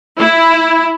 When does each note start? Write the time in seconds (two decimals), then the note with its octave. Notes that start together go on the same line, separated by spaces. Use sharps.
0.18 E4